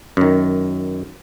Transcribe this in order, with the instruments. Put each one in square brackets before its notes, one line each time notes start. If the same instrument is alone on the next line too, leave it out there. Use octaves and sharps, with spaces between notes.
[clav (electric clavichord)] F#2 D#3